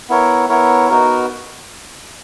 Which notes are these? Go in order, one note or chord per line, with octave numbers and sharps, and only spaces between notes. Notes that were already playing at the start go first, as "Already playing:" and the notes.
B3 E4 A#4 C#5
B3 E4 A#4 C#5
B3 D#4 F#4 A#4